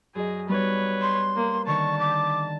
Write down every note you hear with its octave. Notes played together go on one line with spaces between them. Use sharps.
F#2 G#4 D#5
G3 B3 D#4 B4 C#5
C6
A#3
D3 D#3 A5 C#6
D6